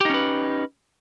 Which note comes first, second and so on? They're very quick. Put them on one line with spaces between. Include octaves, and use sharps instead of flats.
G4 D#4 C#4 B4